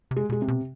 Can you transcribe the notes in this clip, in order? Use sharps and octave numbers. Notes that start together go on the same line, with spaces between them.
C3
G#3
B2 G#3
C3
B2